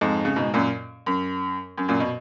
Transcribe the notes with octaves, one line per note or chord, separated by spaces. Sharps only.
F2 G#2
C#3
G#2 B2
F#2 A#2
F#2
F#2
F#2 A#2
B2